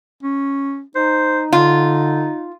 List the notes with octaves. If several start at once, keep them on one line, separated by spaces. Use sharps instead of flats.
C#4
D#4 C5
D3 F4